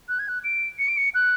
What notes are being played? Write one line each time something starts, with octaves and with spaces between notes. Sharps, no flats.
F#6
G#6
F#6
D7
C#7
D7
C#7
F#6